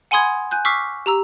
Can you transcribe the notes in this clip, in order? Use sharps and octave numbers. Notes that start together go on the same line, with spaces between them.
F#5 G#5 B5 C6 D#6 G#6
G#5 F#6 G6
C#6 D6 E6 F6 B6 C7
G4 A#5 E6